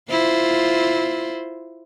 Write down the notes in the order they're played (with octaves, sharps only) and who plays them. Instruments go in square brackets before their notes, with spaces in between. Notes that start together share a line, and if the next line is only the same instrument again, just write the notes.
[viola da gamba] E4 F4 C5